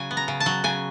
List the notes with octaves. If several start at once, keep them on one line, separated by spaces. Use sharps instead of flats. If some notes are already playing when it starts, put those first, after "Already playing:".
Already playing: C#3 F#3 G#5
B3
A#5
C#3
A5
F#3
C#3 G#5